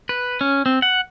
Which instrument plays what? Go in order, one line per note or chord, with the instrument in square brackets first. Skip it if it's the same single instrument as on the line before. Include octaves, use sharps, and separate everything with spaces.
[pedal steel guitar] B4
C#4
C4
F#5